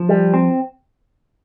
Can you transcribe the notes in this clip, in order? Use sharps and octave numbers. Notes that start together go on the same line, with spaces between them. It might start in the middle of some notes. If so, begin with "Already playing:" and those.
Already playing: F3
G3
C4